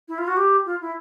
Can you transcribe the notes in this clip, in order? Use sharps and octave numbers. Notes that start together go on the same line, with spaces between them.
E4
F4
F#4
G4
F4
E4